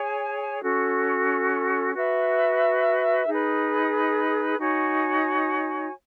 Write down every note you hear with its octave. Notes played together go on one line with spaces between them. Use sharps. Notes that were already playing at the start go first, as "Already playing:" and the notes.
Already playing: G#4 C#5 G#5
C#4 F#4 A4
F#4 B4 E5
D#4 G#4 B4
D#4 F#4 C#5 G#5